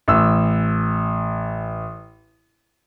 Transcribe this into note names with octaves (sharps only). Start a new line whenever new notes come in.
A1 E6